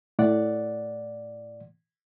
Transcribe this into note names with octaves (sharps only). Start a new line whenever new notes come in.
A2 D5 F#5